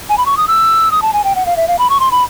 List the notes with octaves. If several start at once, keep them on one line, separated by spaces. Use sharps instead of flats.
G#5
B5
C#6
D#6
E6
D#6
A5
G#5
G5
F#5
F5
E5
F5
B5
C#6
C6
B5